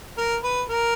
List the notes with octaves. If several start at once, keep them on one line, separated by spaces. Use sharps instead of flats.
A#4
B4
A#4